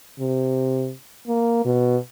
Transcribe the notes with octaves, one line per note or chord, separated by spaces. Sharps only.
C3
A#3
B2